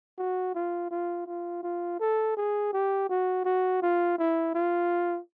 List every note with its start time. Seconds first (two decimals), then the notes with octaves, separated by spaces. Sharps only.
0.18 F#4
0.55 F4
0.91 F4
1.27 F4
1.63 F4
2.00 A4
2.37 G#4
2.73 G4
3.09 F#4
3.45 F#4
3.82 F4
4.18 E4
4.55 F4